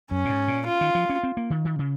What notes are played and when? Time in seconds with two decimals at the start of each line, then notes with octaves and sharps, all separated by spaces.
0.11 F#2 C#4
0.25 A#2
0.29 G#2
0.48 A#2
0.67 F4
0.81 D#3
0.95 F3
1.09 C#4
1.23 C4
1.37 A#3
1.50 D#3
1.65 D#3
1.79 C#3